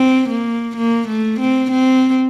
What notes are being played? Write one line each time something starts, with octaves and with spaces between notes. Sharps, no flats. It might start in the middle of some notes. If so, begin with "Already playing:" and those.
Already playing: C4
A#3
A#3
A3
C4
C4